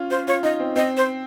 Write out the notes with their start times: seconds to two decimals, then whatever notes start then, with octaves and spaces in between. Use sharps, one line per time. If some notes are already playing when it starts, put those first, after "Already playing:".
Already playing: C#4 F4
0.11 F4 C5
0.27 F4 C#5
0.43 D#4 D#5
0.60 C4
0.76 C4 D#5
0.97 C5